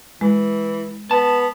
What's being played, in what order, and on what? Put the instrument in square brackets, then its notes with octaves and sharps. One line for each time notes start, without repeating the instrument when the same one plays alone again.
[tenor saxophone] E3 [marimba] G#3
[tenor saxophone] B3 [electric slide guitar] A5